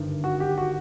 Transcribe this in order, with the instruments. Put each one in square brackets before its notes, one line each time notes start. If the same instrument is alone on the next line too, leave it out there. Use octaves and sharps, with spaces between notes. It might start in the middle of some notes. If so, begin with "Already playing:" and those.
Already playing: [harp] G#1 G2 D3
[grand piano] F#4
G4
F#4